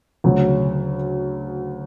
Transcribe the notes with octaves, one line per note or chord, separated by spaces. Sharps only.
D2 C#3 F#3